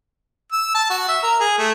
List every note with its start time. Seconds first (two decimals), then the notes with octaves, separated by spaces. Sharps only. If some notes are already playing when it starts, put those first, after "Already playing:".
0.52 E6
0.75 A5
0.90 F#4
1.08 E5
1.23 A#4
1.40 G#4
1.58 A3